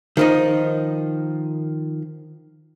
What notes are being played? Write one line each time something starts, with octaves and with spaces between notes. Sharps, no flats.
D#3 F3 D#4